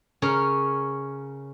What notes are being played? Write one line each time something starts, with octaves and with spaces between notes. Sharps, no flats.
C#3 C#4 A#4 C#5